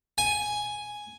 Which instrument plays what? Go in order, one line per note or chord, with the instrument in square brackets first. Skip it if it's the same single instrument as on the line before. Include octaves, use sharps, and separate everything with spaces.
[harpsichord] G#5